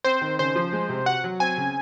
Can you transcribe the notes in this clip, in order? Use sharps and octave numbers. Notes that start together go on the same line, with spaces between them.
C4 C5
D#3
C#3 C5
F3
G#3
C3
F#4 F#5
F#3
C4 G#5
C#3